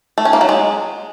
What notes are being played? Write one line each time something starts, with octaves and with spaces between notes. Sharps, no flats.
A3
C#4
A#3
F#3
G#3